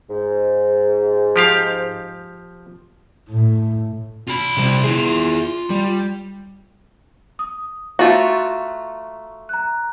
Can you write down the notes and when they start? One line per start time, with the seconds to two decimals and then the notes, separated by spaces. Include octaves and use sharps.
0.10 G#2
1.36 F3 G4 F5
3.29 A2
4.28 F4 B5
4.57 C3 G3
4.84 E4 G#4
5.70 G3
7.39 D#6
7.99 A3 F4 F#4 A#5 C#6
9.49 A#5 F#6